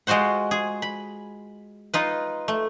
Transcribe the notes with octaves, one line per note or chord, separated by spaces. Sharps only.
G#3 F4 F#4 C5 F#5
G#4
B5
D#4 F4 B4
A3